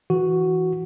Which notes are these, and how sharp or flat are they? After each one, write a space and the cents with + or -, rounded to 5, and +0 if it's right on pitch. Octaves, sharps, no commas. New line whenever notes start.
E3 +0 F#4 +0